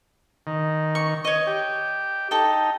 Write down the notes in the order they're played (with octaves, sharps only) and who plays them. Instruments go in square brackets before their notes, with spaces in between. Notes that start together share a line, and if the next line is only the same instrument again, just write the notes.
[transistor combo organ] D#3
[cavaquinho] C#6
C#5 D#5
[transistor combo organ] G4
[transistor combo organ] D#4 [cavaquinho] A4 G5